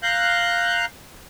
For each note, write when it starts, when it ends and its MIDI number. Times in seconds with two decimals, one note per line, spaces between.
0.03 0.85 77
0.03 0.85 82
0.03 0.85 90
0.03 0.85 91